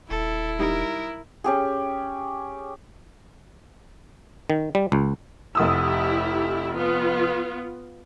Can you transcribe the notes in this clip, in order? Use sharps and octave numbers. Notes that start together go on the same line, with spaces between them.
D#1 E4 A4
G3 D#4 A#4
C#4 G4 G#4
D#3
G3
C#2
F1 E4 G4 D#6 E6
B3 F4